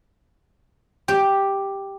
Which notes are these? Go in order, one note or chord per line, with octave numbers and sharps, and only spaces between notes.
G4